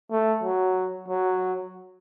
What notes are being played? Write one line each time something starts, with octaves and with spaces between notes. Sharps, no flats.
A3
F#3
F#3